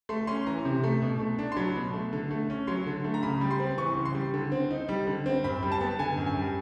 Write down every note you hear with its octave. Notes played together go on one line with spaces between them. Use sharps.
A3 C6
C#4 C6
E3 A#5
C3
A3
B2
A3
D4
C6
F#3 B5
B2
A3
D3
A3
C#4
F#3 C6
D3
A3
A#5
C#3 B5
G3
C6
C4
E3 C#6
C#3
C6
G3
D3
C4
D#4
G3
D3
C4
F#2 B5
G3
A5
B3
D3 G#5
F#2
G#5
G3